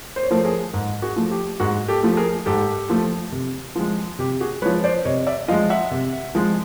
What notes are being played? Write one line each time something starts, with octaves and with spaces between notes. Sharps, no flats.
C5
C#5
F3 A3 A#4 C5
G#4 A#4
G#2
F#4 G#4
F3 A3
G4
G#2 F#4 G#4
G4 A4
F3 A3
G#4 A#4
G#2 G4 A4
F3 A3
C3
F3 G#3
C3 G4
F#4 G#4
F3 G#3 B4 C#5
C5 D5
C3 C#5 D#5
D5 E5
F3 G#3 D#5 F5
E5 F#5
C3
F3 G#3